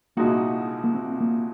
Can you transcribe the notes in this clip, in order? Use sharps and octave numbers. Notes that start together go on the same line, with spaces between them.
C2 A#2 G#3 A#3 D#4 F#4
A#3
C4
A#3